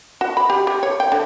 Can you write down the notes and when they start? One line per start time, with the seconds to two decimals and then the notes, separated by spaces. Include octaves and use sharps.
0.21 F#4
0.37 B5
0.50 G4
0.67 G4
0.83 C#5
1.00 G5
1.12 D3